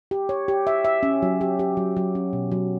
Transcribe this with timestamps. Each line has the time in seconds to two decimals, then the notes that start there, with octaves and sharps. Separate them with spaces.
0.11 G4
0.29 C#5
0.48 G4
0.67 E5
0.85 E5
1.03 C#4
1.22 F#3
1.41 G4
1.59 G4
1.77 F#3
1.97 F#3
2.15 C#4
2.33 B2
2.52 F#3